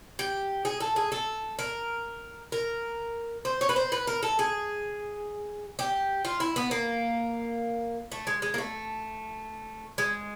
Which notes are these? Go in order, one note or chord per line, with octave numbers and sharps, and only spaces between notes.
G4
G#4
A4
G#4
A4
A#4
A#4
C5
C#5
B4
C5
B4
A#4
A4
G#4
G4
F4
E4
B3
A#3
A3
G#3
G#3
A#3
A3
G#3